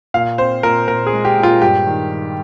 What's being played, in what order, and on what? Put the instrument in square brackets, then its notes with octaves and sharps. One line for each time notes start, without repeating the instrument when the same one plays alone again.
[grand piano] A#2 F5
C4 C5
A#2 A#4
A#2 A#4
G#4
G#3
G4
A#2
F4
G2 G4
D#3
D#3